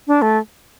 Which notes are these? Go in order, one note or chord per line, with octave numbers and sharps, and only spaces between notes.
D4
A3